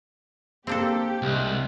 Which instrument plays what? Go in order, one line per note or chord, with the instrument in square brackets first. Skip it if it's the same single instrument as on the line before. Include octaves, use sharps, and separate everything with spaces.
[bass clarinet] A#3 [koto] C4 D4 A4 [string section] G4
[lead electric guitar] C2 [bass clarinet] G#3